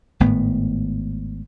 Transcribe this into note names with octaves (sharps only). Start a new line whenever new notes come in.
G#1 A2 B3